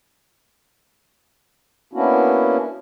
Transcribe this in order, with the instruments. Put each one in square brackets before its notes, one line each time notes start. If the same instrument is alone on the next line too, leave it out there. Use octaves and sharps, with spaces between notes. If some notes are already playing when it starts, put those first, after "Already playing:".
[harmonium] A#3 B3 C#4 D4 E4 F#4